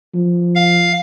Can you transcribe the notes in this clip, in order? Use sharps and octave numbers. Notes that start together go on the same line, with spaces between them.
F3
F5